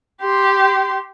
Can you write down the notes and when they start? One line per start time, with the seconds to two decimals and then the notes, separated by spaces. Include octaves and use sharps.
0.22 G4 C6